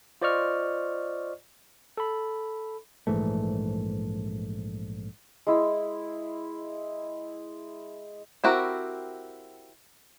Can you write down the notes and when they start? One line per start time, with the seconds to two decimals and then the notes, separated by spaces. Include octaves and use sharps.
0.22 F4 C5 D5 D#5 C#6 F6
1.97 A4 B5
3.07 A#1 G#2 E3 A3
5.47 G#3 E4 E6
8.44 C4 E4 F#4 G4 A#4